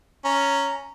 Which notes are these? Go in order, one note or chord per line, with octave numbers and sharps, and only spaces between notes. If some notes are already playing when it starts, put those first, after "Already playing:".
C#4 A#5